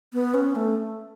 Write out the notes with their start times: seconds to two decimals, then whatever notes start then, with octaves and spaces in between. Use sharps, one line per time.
0.13 B3
0.34 C#4
0.56 A3